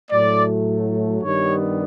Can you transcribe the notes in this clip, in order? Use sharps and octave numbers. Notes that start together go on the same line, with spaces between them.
A2 F#3 A3 D5
G2 D#3 G3 B3 C#5